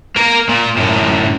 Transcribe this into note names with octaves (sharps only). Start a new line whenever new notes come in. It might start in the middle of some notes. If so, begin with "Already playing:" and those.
A#3 A#4
A#2
F#2 A2